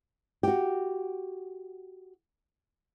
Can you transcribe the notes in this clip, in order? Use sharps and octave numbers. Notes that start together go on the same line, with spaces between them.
F#4 G4